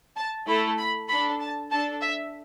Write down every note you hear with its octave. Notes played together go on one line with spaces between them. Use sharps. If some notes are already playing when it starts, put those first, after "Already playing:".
A5
A3 E4 A4 B5
B5
D4 A4 B5
A5
D4 A4 A5
E5